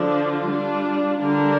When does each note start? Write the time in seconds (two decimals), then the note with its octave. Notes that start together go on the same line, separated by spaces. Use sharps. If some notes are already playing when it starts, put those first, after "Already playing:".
Already playing: D3 F3 D4
0.10 F4
0.47 G3 D4
1.21 D3 G3 D4 A#4